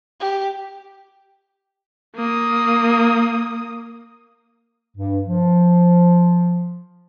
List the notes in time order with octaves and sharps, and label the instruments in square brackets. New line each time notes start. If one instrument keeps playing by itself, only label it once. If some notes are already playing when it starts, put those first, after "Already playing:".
[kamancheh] G4
[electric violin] A#3 D#6
[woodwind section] G2
F3